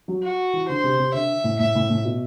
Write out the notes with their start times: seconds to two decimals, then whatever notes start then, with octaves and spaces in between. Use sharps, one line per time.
0.08 F#3
0.23 F#4
0.53 E3
0.68 D3 C5
0.84 C3
0.99 C3
1.14 D3 E5
1.44 A2
1.59 A2 E5
1.75 A2
1.90 A2
2.05 B2